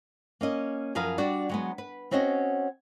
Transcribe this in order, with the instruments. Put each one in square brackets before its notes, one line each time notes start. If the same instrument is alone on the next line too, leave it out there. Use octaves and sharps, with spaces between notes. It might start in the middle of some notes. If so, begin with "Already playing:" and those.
[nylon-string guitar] A#3 C#4 D#5
F#2 F3 G#4 A#4 B4 F5
G3 D4 F#4 D5
F#3 G#3 B3
B4
C4 C#4 F#4 C#5 D#5